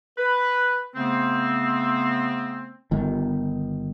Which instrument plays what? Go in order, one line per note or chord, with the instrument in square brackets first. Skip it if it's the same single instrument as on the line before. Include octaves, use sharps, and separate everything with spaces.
[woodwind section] B4
C#3 A3 B3 C4
[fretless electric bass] G1 D#3